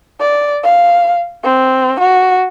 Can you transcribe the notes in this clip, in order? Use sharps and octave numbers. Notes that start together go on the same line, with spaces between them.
D5
F5
C4
F#4